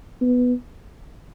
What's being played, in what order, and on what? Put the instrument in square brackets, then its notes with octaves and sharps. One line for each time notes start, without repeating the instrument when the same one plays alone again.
[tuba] B3